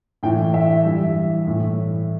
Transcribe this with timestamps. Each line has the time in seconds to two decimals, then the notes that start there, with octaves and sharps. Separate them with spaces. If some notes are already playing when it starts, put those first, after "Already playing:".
0.23 A2 E3 G5
0.54 E5
0.84 G2 E3
1.47 A2 E3